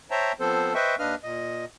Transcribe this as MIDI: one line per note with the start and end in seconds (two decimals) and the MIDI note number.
0.11 0.32 72
0.11 0.32 73
0.11 0.32 76
0.11 0.32 79
0.11 0.32 81
0.11 0.32 82
0.40 0.74 53
0.40 0.74 59
0.40 0.74 60
0.40 0.74 69
0.40 0.74 72
0.74 0.96 71
0.74 0.96 72
0.74 0.96 75
0.74 0.96 76
0.74 0.96 79
0.74 0.96 85
0.99 1.15 39
0.99 1.15 62
0.99 1.15 71
0.99 1.15 75
0.99 1.15 77
0.99 1.15 89
1.23 1.65 46
1.23 1.65 75